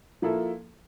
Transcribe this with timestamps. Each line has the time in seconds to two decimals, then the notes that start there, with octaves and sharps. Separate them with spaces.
0.22 F3 A#3 E4 A4